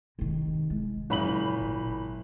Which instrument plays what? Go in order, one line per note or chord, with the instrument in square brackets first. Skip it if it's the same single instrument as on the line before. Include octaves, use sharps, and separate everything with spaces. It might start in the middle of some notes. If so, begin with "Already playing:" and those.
[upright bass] C3 D#3
G#3
[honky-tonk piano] F#1 B5 F#7 [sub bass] A#2
[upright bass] G#1